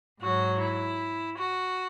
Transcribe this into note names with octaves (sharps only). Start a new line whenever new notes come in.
G#2 F#3 F#4
E4
F#4